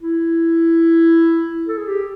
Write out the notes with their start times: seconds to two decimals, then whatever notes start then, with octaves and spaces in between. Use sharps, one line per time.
0.01 E4
1.68 A4
1.78 G#4
1.87 G4